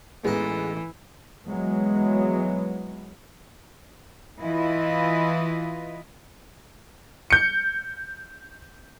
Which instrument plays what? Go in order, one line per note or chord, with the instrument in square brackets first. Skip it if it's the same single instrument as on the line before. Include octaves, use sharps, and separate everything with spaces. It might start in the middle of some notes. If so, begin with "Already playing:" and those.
[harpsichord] A1 D#4 [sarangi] E3 [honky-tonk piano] G#3 B3
[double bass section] E3 F#3 G#3 B3
[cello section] E3 E4 F4 B4 D#5
[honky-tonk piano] G6 C#7